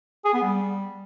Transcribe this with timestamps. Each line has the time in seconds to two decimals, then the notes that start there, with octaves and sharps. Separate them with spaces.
0.25 G#4
0.34 B3
0.42 G3